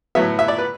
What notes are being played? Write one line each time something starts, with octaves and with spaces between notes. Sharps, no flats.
A2 F#3 B3 E5
E5
D5
B4